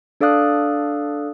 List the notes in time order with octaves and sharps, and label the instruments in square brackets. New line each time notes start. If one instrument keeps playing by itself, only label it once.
[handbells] D4 A4 D5 F5 D#6 F#6